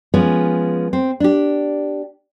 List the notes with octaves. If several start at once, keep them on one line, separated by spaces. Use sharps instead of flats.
F3 G#3 B3 C#4
C4
D4 G4